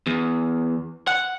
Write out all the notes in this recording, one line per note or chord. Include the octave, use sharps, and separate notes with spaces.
E2
F#5